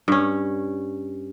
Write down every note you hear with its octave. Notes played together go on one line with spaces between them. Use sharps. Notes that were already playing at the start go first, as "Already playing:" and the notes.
G2 C#4